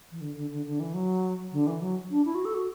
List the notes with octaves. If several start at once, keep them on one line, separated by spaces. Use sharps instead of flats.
E3
D3
D3
D3
D3
E3
F#3
D3
E3
F#3
D4
E4
F#4
A4
F#4